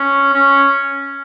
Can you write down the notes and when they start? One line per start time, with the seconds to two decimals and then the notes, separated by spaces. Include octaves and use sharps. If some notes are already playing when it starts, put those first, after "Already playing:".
Already playing: C#4
0.33 C#4